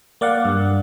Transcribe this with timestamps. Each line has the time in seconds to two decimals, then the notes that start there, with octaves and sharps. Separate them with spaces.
0.21 A#3 D5 F5 F#5
0.45 G2